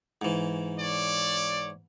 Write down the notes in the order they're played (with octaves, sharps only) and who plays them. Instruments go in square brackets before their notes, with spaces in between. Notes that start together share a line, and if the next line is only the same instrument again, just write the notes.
[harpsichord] G#2 E3
[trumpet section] C#5 D5